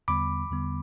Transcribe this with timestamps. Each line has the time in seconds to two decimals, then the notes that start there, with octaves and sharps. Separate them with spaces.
0.08 E2 D3 G3 B3 B5 D6
0.50 E2 D3 G3 B3